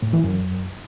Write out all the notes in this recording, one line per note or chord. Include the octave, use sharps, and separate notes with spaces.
A2
E3
F#2